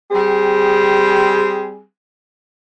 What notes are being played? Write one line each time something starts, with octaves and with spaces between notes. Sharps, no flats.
G3 C4 G#4